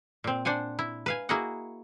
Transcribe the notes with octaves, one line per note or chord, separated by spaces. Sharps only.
A#2 C4
D4 C5 F#5 G#5
E4
B4 F5 G#5
A#3 E4 F#4 G#4 D#5 F#5